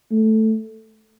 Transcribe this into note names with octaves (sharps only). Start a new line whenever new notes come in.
A3